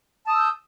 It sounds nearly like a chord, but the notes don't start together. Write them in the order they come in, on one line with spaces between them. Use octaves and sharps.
A5 D#6 E6 G6